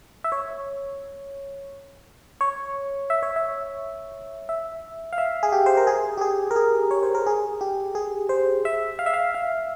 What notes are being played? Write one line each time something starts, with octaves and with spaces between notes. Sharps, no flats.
E5
C#5
C#5
E5
C#5
E5
E5
F5
E5
G#4
G4
C5
A#4
G#4
G4
G#4
A#4
G#4
C#5
C5
A#4
G#4
G4
G#4
C5
E5
F5
E5
F5
F5